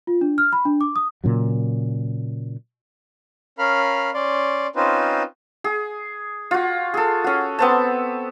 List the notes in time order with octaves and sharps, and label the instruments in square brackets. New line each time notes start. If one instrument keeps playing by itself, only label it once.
[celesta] F4
D4
F6
B5
D4
D6
D#6
[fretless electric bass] A#2 C#3 F#3
[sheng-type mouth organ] C#4 A#4 F5 B5 F6
C#4 D5 C6
C4 C#4 D#4 F4 B4 C5
[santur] G#4
F4 F#4
G#4 A4
C#4 F#4
B3 C4 A5